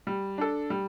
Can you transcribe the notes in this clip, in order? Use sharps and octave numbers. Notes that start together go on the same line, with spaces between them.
G3
D4 A4
G3